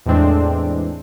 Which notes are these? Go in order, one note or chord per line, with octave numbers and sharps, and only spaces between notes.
E2 A2 G#3 C4 D4